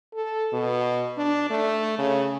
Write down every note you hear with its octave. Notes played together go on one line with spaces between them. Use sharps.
A4
B2
D4
A3
C#3